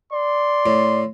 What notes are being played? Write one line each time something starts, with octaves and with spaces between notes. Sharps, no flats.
D5 C6
A2